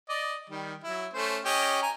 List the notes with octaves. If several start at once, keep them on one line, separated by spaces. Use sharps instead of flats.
D5 D#5
D#3 G3
F#3 E4
A3 C#4 C5
C#4 G4 D#5
G#5 A#5